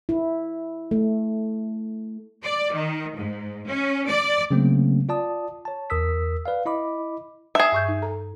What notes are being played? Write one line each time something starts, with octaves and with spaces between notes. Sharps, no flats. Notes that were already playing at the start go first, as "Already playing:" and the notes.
E4
A3
D5
D#3
G#2
C#4
D5
C#3 F#3 A3 A#3 C4 C#4
F4 D5 A5 D#6
C#5 A5
E2 A#4 D#6 E6 B6
B4 D5 F5
E4 D#5 B5 D6
G#4 E5
G2 C#6 G6
D#4
A4 A#5